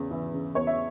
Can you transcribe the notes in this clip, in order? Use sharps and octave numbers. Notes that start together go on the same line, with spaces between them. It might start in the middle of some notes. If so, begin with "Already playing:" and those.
Already playing: E2 C#3
E3
C#3
E2 C#5
E5